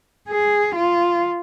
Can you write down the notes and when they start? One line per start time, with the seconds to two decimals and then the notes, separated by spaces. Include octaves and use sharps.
0.29 G#4
0.75 F4